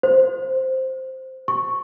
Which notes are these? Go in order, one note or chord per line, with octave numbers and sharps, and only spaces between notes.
C5
C#6